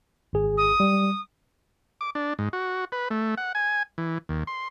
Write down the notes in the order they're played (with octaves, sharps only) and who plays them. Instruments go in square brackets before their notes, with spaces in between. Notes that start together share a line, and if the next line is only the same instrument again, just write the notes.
[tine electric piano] G#1 G#4
[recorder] D#6
[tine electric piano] G3
[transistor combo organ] D6
D4
G#2
F#4
B4
A3
F#5
G#5
E3
D#2
C6